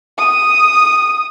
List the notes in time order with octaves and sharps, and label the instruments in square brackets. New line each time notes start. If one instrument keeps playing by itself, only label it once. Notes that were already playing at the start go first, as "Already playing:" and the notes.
[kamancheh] D#6